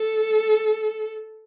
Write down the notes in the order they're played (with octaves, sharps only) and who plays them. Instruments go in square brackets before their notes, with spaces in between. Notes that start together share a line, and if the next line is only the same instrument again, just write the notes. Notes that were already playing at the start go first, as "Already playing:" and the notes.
Already playing: [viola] A4